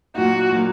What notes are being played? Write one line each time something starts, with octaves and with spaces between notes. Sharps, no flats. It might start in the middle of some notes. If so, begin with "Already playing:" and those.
A#2 F#3 A#3 D#4 F#4
A#2 F#3 A#3 D#4